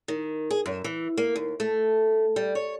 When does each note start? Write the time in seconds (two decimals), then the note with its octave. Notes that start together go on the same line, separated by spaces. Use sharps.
0.08 D#3
0.51 G#4
0.66 F#2
0.84 E3
1.17 A#3
1.36 D#2
1.60 A3
2.36 G3
2.55 C#5